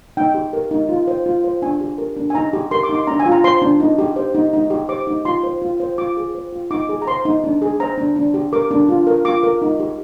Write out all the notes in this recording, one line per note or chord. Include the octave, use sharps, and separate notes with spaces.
D#4 G5
G4
A#4
D#4
F4
C5
F4
C5
D4 G#5
G4
A#4
D4
G#5
D#4 A#5
G4
A#4 C6
D6
D#4
C6
D4 A#5
G#5
F4
A#5
C5 C6
D4
D#4
G4
C5
D#4
D#4
G4
C5 D6
D#4
F4 C6
C5
F4
C5
F4 D6
G#4
C5
F4
D#4 D6
G#4
A#5
C5 C6
D#4
D4
G#4
C5 A#5
D4
D4
G4
A#4 D6
D4
F4
A#4
F4 D6
A#4
D#4
G4